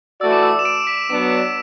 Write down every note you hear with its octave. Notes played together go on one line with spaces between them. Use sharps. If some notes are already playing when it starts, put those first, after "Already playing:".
E3 A3 F#4 D5 E6
D6
E6
E7
D7
B6
F#3 B3 D4 D7